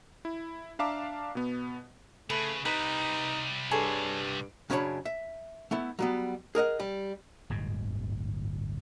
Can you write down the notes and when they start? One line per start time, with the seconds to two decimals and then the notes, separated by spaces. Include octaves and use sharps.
0.25 E4
0.79 D4 E5 F5 A5 A#5 D6
1.35 B2 B3
2.30 C#3 A3 B4
2.65 C3 G3 D#4 B4 B5
3.71 G2 G#4 A4 C#5
4.70 F#2 C#3 C#4 D4 C#5 B5
5.05 E5
5.71 A3 B3 E4
5.99 F#3 G3 B3
6.55 G#4 A#4 D#5 F#5
6.80 G3
7.50 D1 G1 G#2 B2